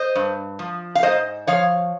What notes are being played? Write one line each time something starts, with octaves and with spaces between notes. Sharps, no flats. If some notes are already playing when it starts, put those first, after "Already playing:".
Already playing: C5 D#5
G2
F3
F5
G#2 C5 D#5
F3 C#5 F5